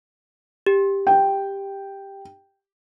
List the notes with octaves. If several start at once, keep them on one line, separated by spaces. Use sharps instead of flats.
G4
G5